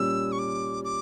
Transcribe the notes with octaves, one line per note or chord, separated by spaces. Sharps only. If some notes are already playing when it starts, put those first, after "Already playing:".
Already playing: A#2 G3 C#4 E6
C#6
D6
D6